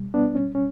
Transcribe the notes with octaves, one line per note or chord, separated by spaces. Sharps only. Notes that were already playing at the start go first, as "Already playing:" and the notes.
Already playing: C#2 B2 G3
B3 D4
C#4
C#4